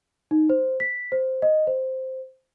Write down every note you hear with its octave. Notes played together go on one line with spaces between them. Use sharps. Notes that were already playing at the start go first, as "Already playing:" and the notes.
D#4
C5
B6
C5
D#5
C5